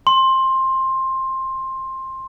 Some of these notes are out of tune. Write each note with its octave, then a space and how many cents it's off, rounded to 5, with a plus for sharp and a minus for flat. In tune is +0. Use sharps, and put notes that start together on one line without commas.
C6 +15